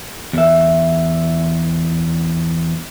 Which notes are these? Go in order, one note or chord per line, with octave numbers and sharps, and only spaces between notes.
E2 E5